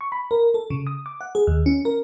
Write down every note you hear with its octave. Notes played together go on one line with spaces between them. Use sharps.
C#6
B5
A#4
A4
C#3
D#6
D6
F#5
G#4
D#2
C#4
A#4